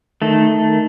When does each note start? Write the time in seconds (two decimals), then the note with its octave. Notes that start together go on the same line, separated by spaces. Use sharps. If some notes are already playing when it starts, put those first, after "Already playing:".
0.22 D#3 A3